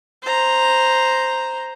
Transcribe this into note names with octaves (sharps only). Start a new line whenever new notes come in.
C5 A#5